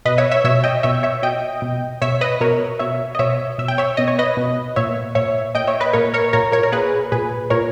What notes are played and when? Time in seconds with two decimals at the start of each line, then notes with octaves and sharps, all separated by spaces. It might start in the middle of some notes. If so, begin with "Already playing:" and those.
0.05 B2 B4 D#5
0.18 C#5 E5
0.31 C#5 E5
0.44 B2 C#5 E5
0.64 D#5 G5
0.83 B2 C#5 E5
1.03 C#5 E5
1.22 B2 D#5 G5
1.62 B2
2.02 B2 C#5 E5
2.21 B4 D#5
2.41 B2 A#4 C#5
2.79 B2 C#5 E5
3.15 D#5
3.19 B2 C#5 E5
3.58 B2 E5
3.68 G5
3.78 C#5 E5
3.97 B2 D#5
4.08 C#5
4.19 B4 D#5
4.37 B2
4.76 A#2 C#5 E5
5.15 A#2 C#5 E5
5.55 A#2 D#5 G5
5.67 C#5 E5
5.80 B4 D#5
5.93 A#2 A#4 C#5
6.14 A#4 C#5
6.33 A#2 A#4 C#5
6.52 A#4 C#5
6.63 A#4
6.72 A#2 G#4 B4
7.12 A#2 G#4 B4
7.50 A#2 A#4 C#5